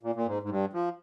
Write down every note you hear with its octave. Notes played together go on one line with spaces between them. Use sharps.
A#2
A#2
G#2
G#2
G2
F3